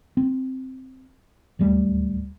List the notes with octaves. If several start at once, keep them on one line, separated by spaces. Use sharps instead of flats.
C4
D1 D#2 G3 A3